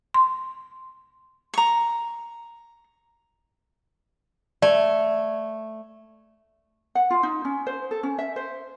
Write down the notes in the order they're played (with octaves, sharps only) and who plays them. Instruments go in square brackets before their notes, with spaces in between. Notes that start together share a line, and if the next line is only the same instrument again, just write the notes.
[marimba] C6
[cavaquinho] A#5 C#6
[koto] A3 [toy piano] D5
[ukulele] F#5
F4
D#4
C#4
C5
A4
C#4
E5
C5